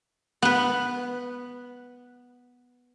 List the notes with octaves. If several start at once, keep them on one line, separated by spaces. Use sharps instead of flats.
B3 B4